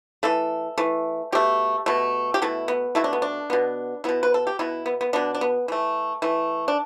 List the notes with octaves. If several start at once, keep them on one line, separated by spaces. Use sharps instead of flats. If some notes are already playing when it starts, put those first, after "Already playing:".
E3 A3 A4
E3 A3
B2 A3 G4
B2 A3
G4
B2 A3 E4
B3
B2 A3 E4
D4
B3
D4
B2 B3
B2 B3 E4
B4
A4
G4
B2 B3 E4
B3
B3
B2 B3 D4
D4
B3
E3 A3
E3 A3
D4